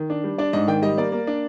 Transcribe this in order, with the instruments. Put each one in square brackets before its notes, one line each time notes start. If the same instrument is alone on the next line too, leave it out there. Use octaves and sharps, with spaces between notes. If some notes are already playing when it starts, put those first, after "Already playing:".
Already playing: [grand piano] D#3
D4
G3
D4 D5
G#2 D#5
D#3 G5
G3 D#5
A#3 D5
A#3
D4